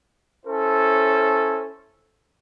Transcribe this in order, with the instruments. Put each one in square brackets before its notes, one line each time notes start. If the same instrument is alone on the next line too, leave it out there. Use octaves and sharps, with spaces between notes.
[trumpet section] C#4 E4 A4 C5 C#5